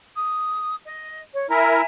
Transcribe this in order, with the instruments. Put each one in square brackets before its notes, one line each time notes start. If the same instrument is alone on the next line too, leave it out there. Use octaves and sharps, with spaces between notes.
[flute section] D#6
D#5
C#5
[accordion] E4 A#4 [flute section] E5 G#5 A#5